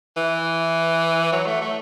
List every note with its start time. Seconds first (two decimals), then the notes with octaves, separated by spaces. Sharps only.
0.17 E3
1.32 F#3
1.47 A3
1.61 A3